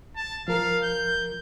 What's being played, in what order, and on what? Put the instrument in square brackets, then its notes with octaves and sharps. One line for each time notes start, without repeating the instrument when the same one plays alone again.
[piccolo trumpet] A5
[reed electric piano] F3 A#4 [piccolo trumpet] F5
[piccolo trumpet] G6